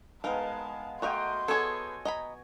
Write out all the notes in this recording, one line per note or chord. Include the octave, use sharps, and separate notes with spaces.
G#3 B3 D#4 A#4 F5 A5
A3 F#4 A#4 D#5 F5 G5 C6
B3 G#4 A4 C#5 G#5
D#5 A#5 B5